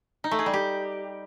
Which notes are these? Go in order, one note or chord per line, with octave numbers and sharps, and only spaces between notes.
D#4
A3
G#4
G3
G4